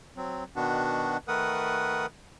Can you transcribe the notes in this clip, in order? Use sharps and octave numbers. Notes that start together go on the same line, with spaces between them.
F#3 C4
B2 D#3 B3 D4 F#4
D#3 A3 A#4 B4 F#5 D#6